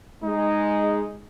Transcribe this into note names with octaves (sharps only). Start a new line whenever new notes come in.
G#3 D#4